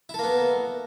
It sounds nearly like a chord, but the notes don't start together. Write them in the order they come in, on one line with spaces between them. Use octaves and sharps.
E4 A4 A#3 B3